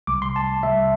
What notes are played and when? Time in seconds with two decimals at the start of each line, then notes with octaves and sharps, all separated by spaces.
0.07 C2 C3 G3 D6
0.22 C6
0.36 A5
0.63 C2 C3 G3 E5